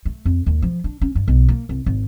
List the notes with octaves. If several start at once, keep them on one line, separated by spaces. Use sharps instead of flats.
A3
F2
D#2
F3
D4
C#4
G2
B1
A#3
C2
G#1